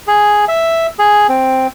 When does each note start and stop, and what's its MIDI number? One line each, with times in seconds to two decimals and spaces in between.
0.08 0.45 68
0.48 0.87 76
0.99 1.27 68
1.29 1.67 60